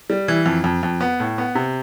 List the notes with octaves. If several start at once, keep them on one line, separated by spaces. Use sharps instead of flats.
G3
E3
F2
F2
F2
B3
A2
B3
C3